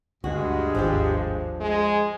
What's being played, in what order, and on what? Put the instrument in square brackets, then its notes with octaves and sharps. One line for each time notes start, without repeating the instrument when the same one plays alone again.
[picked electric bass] D2 [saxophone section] G2 G#3 [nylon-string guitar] F#4
[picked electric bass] G#1 D#2 [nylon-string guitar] F3 D4 G4
[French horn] G#3